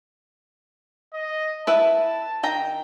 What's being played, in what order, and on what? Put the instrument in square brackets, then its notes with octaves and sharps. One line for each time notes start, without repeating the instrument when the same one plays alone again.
[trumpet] D#5
[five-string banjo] E4 B4 E5 [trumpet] A5
[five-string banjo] D#3 G5 A#5